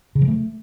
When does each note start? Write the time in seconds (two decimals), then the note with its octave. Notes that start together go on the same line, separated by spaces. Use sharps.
0.15 C#3
0.22 F3
0.28 A3